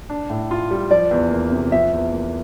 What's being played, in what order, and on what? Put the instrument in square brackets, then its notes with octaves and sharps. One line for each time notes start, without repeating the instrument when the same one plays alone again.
[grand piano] D4
A2
F4
G3
[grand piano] F3 [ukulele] D5
[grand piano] E2
A#3
C3
[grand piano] F3 [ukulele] E5
[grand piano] E2
A#3